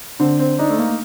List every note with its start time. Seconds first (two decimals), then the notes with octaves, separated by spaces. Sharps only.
0.20 D3 C4
0.40 C4
0.59 D4 D#4
0.70 A3
0.79 A#3